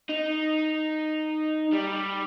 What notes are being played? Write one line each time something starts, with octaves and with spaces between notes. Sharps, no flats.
D#4
G3